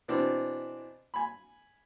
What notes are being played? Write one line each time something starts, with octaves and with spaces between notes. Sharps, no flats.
B2 E3 C4 D4
G#5 B5